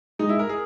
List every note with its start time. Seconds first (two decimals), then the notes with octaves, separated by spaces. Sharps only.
0.19 G#3 D#4
0.29 E4
0.39 A#4
0.49 G#4